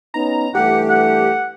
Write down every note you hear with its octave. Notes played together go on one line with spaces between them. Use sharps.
B3 C#4 D#4 A#5
G2 E3 A3 G4 F#5
F#5